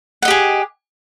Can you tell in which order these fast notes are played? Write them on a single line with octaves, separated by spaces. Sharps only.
F#5 D#5 G4 G#4